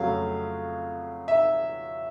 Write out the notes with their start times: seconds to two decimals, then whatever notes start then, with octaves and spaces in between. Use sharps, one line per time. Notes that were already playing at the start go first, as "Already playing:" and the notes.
Already playing: F2 C#3 F#3 A3 F5
1.28 E5